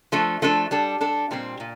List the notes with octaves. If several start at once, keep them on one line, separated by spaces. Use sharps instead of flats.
F3 A3 D4 A4
F3 A3 D4 A4
G3 D4 A4
G3 D4 A4
A#2 G3 C4
A#2